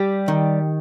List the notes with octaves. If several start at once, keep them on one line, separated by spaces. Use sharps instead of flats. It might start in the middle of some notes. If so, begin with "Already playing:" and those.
Already playing: G3 G4
D#3